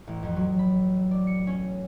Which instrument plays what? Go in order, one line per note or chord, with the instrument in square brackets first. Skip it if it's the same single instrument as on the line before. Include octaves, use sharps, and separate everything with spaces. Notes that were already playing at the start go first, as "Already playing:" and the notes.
[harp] A1
F2
F#3
B5
D5
C#7
C#4